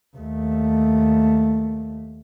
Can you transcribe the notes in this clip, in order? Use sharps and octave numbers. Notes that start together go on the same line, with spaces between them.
D#2 A3